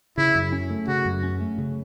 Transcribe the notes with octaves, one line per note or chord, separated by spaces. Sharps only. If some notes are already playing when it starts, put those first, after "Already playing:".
C#3 E4
F#2
C#4
A3
C#3 F#4
F#2
C#4
A3
C#3